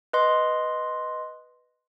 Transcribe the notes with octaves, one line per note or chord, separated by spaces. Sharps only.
B4 D#5 C6